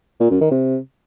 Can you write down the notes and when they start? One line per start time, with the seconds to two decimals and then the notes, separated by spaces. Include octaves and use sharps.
0.20 A#2
0.30 F#2
0.41 D#3
0.51 C3